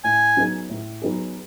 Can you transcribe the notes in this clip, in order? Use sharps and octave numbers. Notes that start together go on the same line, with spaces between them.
A2 G#5
F#3 B3 D#4 G#4
A2
F#3 B3 D#4 G#4